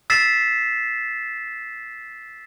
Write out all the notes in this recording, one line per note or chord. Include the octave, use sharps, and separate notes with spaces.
E6 A6 B6 C7 E7